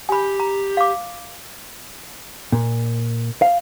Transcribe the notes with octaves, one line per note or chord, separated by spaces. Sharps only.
G4 G#5 B5
A#5
F5 D6
A#2
F5